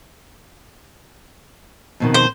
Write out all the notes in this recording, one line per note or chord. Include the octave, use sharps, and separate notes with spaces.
F2 B2 D#3
C5